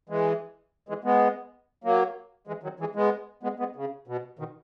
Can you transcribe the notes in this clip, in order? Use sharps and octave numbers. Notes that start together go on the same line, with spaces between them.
E3 G#3
E3 G#3
G#3 B3
F#3 A#3
E3 G#3
D#3 F#3
E3 G#3
G#3 B3
G#3 B3
G#3 B3
C#3
B2
B2 D#3